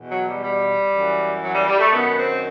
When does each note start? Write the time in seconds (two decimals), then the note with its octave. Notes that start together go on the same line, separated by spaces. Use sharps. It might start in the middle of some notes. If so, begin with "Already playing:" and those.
Already playing: E2 B2
0.10 F#3
0.26 G3
0.42 G3
0.92 F#2 E3
1.42 F#3
1.54 G3
1.67 G3
1.79 A3
1.92 F#2 D#3 B3
2.16 C4